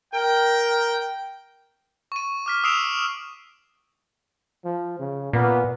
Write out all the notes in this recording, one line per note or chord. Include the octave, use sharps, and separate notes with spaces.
A#4 G5
C#6 D#7
D6 F6 B6
D#6 E6 C7 D7 E7 F7
F3
C#3
A#2 B3